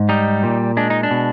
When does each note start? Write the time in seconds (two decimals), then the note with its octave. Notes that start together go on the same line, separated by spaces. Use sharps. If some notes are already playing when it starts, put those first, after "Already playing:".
Already playing: G#2
0.09 G3 D#4
0.43 A#2
0.77 G#3 D4
0.90 D#4
1.03 D4
1.11 B2